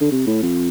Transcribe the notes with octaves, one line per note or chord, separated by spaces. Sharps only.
D3
C3
A2
F2